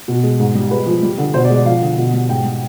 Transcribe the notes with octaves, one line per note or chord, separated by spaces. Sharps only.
B2
G#3
G#2
G3
G#3 B4
F3
G3
D3
B2 C5
D5
G#3
D5
F3 F5
D3
B2
G3
G#2 G5
G3